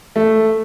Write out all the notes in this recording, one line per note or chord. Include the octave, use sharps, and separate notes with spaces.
A3